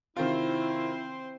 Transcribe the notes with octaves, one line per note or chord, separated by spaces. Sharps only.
C3 D#3 C4 E4 F4 C5